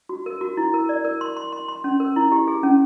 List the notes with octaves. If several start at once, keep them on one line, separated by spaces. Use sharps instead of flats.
F#4
A#4
F#4
E4
A#4
D5
A#4
C6
C6
C6
C6
C#4
A#4
E4
G4
G#4
C#4